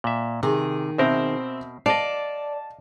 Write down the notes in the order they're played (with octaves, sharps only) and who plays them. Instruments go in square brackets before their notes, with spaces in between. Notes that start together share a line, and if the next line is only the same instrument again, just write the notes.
[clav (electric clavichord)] A#2 E5
[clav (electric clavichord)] C3 [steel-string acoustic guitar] D#3 G#4
[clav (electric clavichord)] B2 A#4 [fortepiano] C4 C5 E5
[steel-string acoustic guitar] D5 [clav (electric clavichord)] D#5 F5 [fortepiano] A5